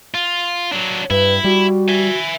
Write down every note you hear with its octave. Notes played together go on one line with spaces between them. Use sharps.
F4
F#3 D4
G2 E4 B4
G3 F#4
E5 G#5